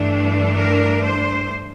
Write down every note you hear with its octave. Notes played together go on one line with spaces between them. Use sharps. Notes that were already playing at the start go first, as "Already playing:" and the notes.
Already playing: G2 E3 A3 D4
A#4
C5